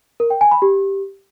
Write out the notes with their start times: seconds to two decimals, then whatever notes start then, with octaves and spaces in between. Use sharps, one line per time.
0.20 A#4
0.30 G5
0.41 G#5
0.51 B5
0.62 G4